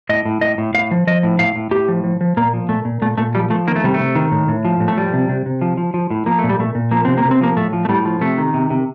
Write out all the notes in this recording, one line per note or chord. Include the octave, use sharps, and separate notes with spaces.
A2 D#5
A2
A2 D#5
A2
A2 F5
F3
F3 D#5
A2
A2 F5
A2
A2 G4
F3
F3
F3
A#2 A#3
F3
A#2 A3
A#2
A#2 A3
A#2 A3
F3 G3
F3 A3
D#3 A#3
A3
C3 G3
A3
C3
D#3
A2
A2
F3
A2
A3
F3 G3
C3
C3
C3
F3
F3
F3
A2
F3 A#3
A3
A#2
G3
A#2 A3
A#2
F3 A#3
C3 C4
A#3
C3
C4
F3 A#3
A2 A3
F3
A3
A2 G3
F3
C3 A3
D#3
C3
C3